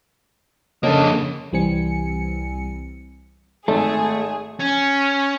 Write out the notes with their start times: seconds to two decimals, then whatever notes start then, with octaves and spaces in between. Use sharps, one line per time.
0.83 F2 C#3 A#3 C#4 D4 A4 D#5
1.52 C2 E3 G3 C4 G#5 C#7
3.68 G#1 A3 G#4 A4
4.59 C#4